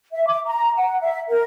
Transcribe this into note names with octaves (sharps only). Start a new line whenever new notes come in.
E5
D6
A#5
F#5
E5
A#4